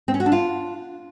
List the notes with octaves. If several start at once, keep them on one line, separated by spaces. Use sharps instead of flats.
C4
C#4
F#4
D4
F4